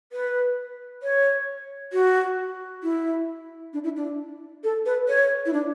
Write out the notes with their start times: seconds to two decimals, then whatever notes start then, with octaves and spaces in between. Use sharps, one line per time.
0.12 B4
1.03 C#5
1.93 F#4
2.83 E4
3.73 D4
3.84 E4
3.96 D4
4.64 A4
4.86 B4
5.08 C#5
5.46 E4
5.53 D4